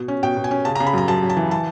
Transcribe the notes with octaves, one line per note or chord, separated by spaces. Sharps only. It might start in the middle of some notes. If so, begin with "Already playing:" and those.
Already playing: B2
C#4
B2 G5
B2
G#5
C#4
C#3 A5
A#5
C#3
B5
F#2 A#5
F#2 A5
F#2
A5
E3
A5